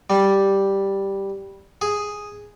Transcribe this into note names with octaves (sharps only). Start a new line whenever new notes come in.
G3
G#4